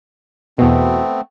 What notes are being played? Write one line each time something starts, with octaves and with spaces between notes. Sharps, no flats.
E2 B2 A3 B3 C4